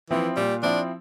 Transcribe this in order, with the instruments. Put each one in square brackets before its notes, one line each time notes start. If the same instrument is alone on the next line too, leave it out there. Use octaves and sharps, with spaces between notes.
[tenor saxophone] E3 [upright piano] F3 C4 E4
[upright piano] A#2 [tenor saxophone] G3
[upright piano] F3 C4 E4 [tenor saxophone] D4